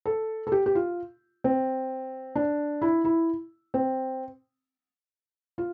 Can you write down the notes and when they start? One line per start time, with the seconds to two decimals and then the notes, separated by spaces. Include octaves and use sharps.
0.06 A4
0.47 A4
0.52 G4
0.66 G4
0.75 F4
1.44 C4
2.35 D4
2.82 E4
3.05 E4
3.74 C4
5.58 F4